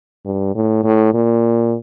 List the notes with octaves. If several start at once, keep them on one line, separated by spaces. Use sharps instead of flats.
G2
A2
A2
A#2